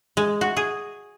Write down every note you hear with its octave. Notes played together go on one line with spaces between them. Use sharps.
G#3
F#4
G#4